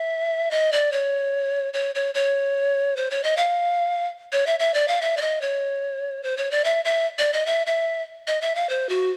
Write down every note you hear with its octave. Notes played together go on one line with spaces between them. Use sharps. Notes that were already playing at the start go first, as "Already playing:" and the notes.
Already playing: E5
D#5
D5
C#5
C#5
C#5
C#5
C5
C#5
D#5
F5
C#5
E5
E5
D5
F5
E5
D5
D#5
C#5
C5
C#5
D5
E5
E5
D5
D#5
E5
E5
D#5
E5
F5
C5
F#4